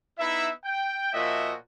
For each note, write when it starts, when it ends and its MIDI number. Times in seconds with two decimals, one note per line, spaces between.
0.19 0.49 59
0.19 0.49 63
0.19 0.49 64
0.19 0.49 76
0.64 1.12 79
1.13 1.53 46
1.13 1.53 53
1.13 1.53 66
1.13 1.53 75
1.13 1.53 76